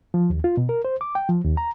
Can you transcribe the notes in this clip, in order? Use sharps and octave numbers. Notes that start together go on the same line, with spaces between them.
F3
D#2
F4
B2
A#4
C5
D6
G5
F3
D#2
A#5